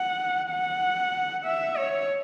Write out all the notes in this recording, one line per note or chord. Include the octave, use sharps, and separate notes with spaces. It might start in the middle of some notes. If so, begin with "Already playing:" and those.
Already playing: F#5
F#5
E5
C#5